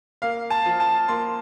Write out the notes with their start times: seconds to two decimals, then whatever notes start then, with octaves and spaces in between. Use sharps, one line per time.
0.22 A#3 F5
0.50 A5
0.65 F3
0.80 A5
1.08 A#3 C6